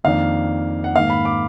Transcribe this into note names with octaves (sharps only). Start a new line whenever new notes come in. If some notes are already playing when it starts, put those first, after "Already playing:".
F2 D#3 A#3 D4 F5
F#5
G#2 D#3 A#3 F5
B5
D6